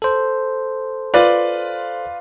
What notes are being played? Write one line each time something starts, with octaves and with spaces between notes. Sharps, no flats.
A4 C5
F4 B4 D5